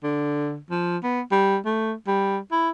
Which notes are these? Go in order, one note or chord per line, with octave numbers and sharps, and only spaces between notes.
D3
F3
B3
G3
A3
G3
E4